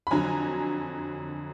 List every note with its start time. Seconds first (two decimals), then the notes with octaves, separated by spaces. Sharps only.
0.07 B5
0.11 F2 D3 F#3 G#5 A#5